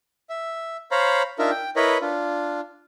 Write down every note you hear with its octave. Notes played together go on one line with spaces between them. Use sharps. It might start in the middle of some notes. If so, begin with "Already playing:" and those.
E5
C5 C#5 F5 A#5 B5
D4 D#4 F4 A#4 E5
G5
E4 A#4 B4 C#5 D#5 B5
D4 F4